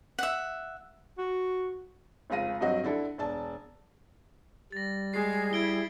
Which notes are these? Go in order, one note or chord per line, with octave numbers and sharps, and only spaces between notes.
E5 F#5
F#4
F1 C#2 F4 A#6 D#7
G2 F#3 C4 F#4 D#5
D3 D4 E4 A4
E1 D4 A5
G3 A6 A#6
G#3 G#4 C7
E4 G#6 D7 G7